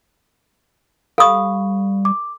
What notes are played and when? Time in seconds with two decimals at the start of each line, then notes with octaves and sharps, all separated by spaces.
1.18 G3 A4 F5 B5 C#6 D#6
2.05 D6